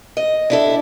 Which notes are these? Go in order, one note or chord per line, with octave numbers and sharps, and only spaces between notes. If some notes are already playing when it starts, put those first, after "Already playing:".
D#5
D4 E4 A4